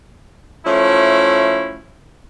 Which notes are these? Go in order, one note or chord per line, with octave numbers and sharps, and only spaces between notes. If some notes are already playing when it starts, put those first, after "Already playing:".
F3 A3 C#4 E4